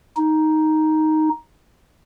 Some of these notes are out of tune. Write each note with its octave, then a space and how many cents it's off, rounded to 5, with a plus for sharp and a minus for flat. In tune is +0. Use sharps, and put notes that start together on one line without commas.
D#4 +5